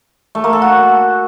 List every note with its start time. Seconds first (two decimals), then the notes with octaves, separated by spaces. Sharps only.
0.35 A3
0.44 A#3
0.53 A4
0.62 F#4